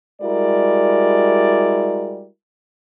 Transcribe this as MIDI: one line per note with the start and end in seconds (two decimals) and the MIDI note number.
0.22 2.27 55
0.22 2.27 56
0.22 2.27 64
0.22 2.27 66
0.22 2.27 70
0.22 2.27 74